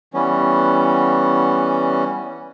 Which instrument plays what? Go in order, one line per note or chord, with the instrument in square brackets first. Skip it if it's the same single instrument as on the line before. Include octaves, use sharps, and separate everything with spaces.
[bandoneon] E3 G3 B3 C#4